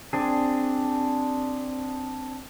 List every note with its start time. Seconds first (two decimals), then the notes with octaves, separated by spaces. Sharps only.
0.13 C4 D4 G#4